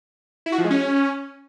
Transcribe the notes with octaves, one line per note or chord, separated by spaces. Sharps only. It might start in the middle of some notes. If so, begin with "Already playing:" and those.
E4
F#4
F3
G#3
C#4